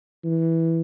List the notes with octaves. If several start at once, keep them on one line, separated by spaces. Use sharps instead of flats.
E3